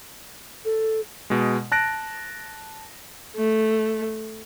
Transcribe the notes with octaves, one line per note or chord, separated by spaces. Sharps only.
A4
B2 G#3
A5 F#6 A#6 D7
A3